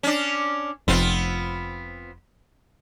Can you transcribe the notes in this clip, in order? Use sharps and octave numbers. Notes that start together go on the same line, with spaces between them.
C#4 D4
F1 F2 B3 C4 F4